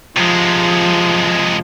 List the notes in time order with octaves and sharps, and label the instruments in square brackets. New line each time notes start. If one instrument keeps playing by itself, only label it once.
[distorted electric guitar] C3 G#3 [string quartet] F3